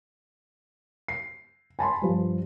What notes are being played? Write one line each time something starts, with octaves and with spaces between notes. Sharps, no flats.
C7
G#5 A5 B5 C6
G2 F3